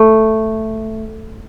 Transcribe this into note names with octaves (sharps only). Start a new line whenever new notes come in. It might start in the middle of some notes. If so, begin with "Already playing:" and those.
Already playing: A3